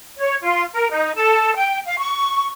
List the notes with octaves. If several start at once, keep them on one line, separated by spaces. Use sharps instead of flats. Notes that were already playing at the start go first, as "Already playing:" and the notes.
C#5
F4
A#4
D#4
A4
G5
F5
C#6